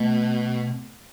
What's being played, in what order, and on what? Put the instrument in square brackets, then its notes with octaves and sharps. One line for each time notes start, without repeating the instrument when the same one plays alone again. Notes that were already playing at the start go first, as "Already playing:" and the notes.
Already playing: [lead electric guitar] B2 [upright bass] A3